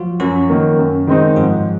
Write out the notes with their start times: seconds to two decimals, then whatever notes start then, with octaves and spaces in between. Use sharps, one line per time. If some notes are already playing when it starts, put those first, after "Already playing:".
Already playing: F3 F#3 F4 F#4
0.20 F#2 F#3 F#4
0.49 D#3 A#3
0.78 F#2
1.07 D#3 G#3 C4 D#4
1.36 G#2 F3 F4